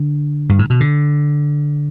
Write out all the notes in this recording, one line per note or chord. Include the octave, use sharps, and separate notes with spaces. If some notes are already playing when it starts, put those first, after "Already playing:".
Already playing: D3
G2
A2
B2
D3